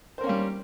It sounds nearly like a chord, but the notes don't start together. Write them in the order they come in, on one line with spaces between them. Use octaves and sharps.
C5 A#4 C#4 A#3 G3